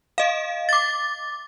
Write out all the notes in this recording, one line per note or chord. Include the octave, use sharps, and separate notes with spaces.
D#5 F5
D6 A6